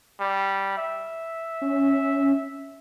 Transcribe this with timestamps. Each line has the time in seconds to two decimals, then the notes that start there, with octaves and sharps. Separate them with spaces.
0.21 G3
0.78 E5
1.61 C#4